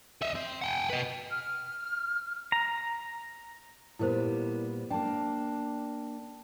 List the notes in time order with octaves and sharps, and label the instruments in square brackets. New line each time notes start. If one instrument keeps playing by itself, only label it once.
[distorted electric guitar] D#5 E5
C4
F#5 G5
B4 D#5
[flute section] F6
[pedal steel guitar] A#5
[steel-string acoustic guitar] A#2 G3 B3 [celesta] E4 A#4 C5
[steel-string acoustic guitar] A#3 D4 [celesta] G5 A5